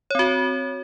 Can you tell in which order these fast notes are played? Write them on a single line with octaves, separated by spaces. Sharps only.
C#5 C4 F#4